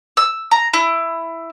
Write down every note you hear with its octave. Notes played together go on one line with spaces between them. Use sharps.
E6
A#5
E4